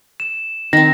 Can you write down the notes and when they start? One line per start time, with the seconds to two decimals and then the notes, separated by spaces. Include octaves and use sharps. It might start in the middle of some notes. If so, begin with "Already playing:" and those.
0.20 E7
0.73 D#3 C4 D#4 A#6